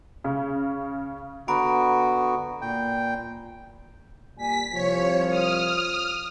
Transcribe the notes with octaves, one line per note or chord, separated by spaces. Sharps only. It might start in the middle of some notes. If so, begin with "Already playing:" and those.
C#3
D3 B3 F#4 A#5 B5 D7
A#2 G5
A#2 G3 G#5 B6
C2 F3 C#5
D#6 F6